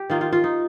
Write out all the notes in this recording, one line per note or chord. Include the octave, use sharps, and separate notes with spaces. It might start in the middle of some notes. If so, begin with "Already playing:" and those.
Already playing: G4
D#3 A#3 D#4 F4
F4
F4
D#4